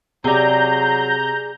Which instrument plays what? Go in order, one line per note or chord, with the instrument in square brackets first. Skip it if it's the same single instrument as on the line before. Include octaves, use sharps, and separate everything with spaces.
[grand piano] C3 [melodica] F#3 [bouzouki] G#4 D5 [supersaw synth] A#5 G6